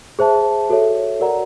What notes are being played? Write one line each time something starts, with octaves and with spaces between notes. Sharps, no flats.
G#4 C5 E5 A5
F#4 A4 C#5 E5
F#4 A#4 D5 F#5 A#5